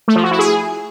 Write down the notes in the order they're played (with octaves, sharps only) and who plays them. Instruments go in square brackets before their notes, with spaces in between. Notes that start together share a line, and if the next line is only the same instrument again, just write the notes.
[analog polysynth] A3
F3
F#4
E4
G#4